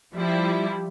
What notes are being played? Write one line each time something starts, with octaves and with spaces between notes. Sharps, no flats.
F3 G3 E4